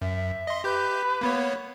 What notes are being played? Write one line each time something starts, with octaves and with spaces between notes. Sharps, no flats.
F#2 E5
D#5 C6
G4 B4 G6
A#3 B3 C#5